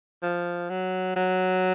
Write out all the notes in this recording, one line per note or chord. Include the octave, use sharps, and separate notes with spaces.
F3
F#3
F#3